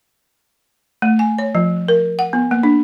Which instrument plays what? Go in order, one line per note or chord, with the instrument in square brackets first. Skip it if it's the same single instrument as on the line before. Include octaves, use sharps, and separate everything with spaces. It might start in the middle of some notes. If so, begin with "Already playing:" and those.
[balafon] A3
G#5
C#5
F3
A#4
F#5
B3
A#3
D4